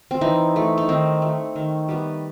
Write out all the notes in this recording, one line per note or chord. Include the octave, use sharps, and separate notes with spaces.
C4
E3 D#4
A3
D#4
D#3 C4
A3
D#3
G3 B3